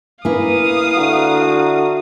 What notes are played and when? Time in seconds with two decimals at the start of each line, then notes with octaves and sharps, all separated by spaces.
0.25 A#3 E4 B4 F5 G#5 D#6
0.97 D3 F#4 E5 A#5